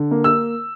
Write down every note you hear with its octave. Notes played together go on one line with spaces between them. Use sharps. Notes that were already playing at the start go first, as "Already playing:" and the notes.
Already playing: D3
A#3
E6